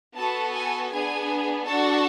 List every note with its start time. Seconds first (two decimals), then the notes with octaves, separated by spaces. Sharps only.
0.16 B3 F#4 A4 A5
0.53 G#5
0.90 B3 D4 G#4 G#5
1.66 D4 F#4 A4 A5